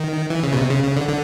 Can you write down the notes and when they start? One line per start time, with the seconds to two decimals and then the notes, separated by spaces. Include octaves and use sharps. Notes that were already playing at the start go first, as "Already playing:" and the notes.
Already playing: D#3
0.30 E3
0.43 C#3
0.52 B2
0.57 C3
0.70 C#3
0.83 C#3
0.97 D3
1.09 D3